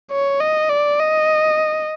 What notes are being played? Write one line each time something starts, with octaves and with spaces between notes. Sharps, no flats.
C#5
D#5
D5
D#5